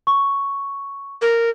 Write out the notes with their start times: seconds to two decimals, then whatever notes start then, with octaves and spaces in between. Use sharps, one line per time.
0.07 C#6
1.22 A#4